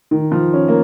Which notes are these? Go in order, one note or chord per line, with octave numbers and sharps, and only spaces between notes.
D#3
F3
C#4
A#3